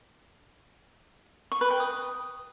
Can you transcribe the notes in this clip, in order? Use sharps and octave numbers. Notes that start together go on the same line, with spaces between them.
C#6
B4
G5
D#6